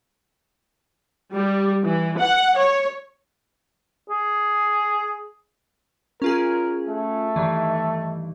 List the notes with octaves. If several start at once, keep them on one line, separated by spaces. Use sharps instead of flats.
G3
E3
F#5
C#5
G#4
C#4 F4 G#4 A#4
A3
G2 D#3 E3